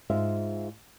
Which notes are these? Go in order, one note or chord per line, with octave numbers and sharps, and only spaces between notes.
G#2 F4 E5 F5